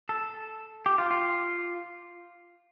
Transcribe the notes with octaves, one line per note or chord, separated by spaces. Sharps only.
A4
G4
F4
F4